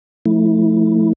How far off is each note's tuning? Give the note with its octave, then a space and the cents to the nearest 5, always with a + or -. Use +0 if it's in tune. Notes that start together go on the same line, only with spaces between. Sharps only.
F3 -10 A3 +0 E4 -20